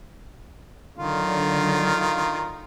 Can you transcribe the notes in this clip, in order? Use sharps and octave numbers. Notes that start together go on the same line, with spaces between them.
D3 D#3 F#3 F4 F5